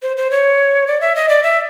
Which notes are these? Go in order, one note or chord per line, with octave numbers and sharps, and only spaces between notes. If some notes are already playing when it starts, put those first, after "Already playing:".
C5
C5
C#5
D5
E5
D#5
D5
E5